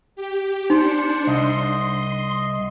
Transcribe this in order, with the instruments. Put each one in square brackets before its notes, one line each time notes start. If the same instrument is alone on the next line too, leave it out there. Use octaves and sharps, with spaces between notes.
[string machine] G4
[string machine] D4 C#7 [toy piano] D#4 [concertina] C5
[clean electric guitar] C2 [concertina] D#5 [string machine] C6